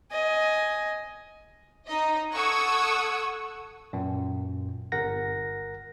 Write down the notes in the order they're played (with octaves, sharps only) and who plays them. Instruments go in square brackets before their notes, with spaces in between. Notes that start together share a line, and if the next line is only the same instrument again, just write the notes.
[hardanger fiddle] D#5 G#5
[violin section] D#4 D#5
A4 F#5 C#6 D#6 E6 G#6
[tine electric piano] F#2 A#2
G1 A#4 F#5 A#6